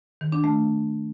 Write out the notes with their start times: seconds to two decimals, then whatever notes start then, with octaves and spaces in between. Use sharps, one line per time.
0.21 D#3
0.32 D4
0.44 A3